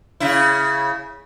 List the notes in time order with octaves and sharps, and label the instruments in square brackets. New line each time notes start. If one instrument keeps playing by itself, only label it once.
[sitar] C#3 E4